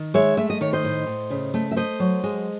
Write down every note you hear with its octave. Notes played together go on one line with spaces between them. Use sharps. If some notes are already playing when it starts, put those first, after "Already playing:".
Already playing: D#3
G#3 C#5 E5
A3 E5
D#5
D#3 C#5
C5 D#5
A2
A2
C#3
A3
E5
A3 C5 D#5
F#3
G#3